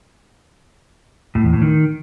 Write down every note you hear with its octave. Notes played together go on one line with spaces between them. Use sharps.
A2
E2
A2
D#3